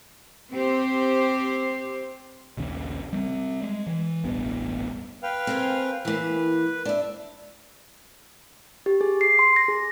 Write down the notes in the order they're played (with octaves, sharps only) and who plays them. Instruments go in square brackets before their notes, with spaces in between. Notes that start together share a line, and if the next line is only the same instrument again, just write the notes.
[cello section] C4 G4 C5
[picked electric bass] A#1 D#2 C#3
G3 A3 C4
G#3
E3
E1 A1 G2 B3
[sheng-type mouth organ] B4 F5 G5
[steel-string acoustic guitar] C4 G#4 A#4
[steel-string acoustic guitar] E3 A#3 [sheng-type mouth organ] B4
[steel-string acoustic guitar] D4 E5
[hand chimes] G4
G#4
C7
C6
A#6
G#4